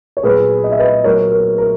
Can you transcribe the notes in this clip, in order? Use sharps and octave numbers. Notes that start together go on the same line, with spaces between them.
C#5
A#2 F#3 B3 G#4 B4
D#5
E5
B4 D#5
A#2 F#3 B3 A#4 C#5
A#4
A#4